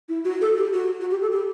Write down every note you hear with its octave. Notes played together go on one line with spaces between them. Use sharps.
E4
F#4
A4
G4
F#4
F#4
G4
A4
G4